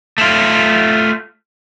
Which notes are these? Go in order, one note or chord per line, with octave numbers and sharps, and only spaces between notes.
A3 F4